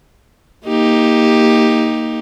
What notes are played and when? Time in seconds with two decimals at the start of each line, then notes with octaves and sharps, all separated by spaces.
0.66 A#3 D#4 G4